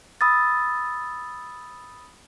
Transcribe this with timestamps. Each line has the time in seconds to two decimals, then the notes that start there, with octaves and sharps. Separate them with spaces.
0.21 B5 D#6 E6 A6